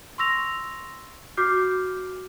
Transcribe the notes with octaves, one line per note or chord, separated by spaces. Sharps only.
C6 C#6 E6 A#6 F7
F#4 D6 F6 G6 C7